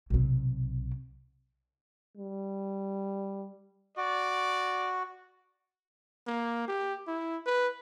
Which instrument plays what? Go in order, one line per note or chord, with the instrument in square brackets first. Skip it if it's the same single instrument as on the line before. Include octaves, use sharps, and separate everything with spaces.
[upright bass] B1 C3
[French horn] G3
[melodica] F#4 [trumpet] D5
[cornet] A#3
G4
E4
B4